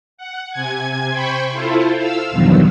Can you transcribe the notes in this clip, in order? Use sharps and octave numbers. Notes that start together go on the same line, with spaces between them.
F#5
C3 G#5 G#6
C5 G5 B5 C#6
E4 F4 A4 C5
F5 E6
E2 G2 B2 D#3 F3 F#3